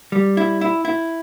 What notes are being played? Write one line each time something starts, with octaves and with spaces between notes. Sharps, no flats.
G3
E4
E4
E4